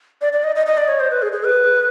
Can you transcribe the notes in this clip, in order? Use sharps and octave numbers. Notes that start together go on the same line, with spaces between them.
D5
D5
D#5
D#5
D#5
D5
C#5
C5
B4
G#4
G#4
B4